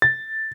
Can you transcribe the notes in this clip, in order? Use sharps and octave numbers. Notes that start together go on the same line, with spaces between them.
A6